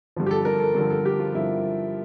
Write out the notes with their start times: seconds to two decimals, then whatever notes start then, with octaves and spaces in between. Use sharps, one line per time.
0.16 G2 D3 F3
0.26 G4
0.31 A4
0.45 A#4
0.60 A4
0.75 G2 D3 F3 A4
0.90 A4
1.06 G4
1.20 F4
1.34 G2 D3 F3 E4